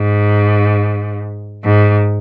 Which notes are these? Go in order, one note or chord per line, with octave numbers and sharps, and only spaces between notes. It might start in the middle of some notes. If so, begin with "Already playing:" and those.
Already playing: G#2
G#2